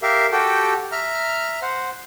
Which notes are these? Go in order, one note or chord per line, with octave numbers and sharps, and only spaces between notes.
G4 A#4 E5 F5
F#4 G4 A4 G5
E5 A#5 F6
C5 F#5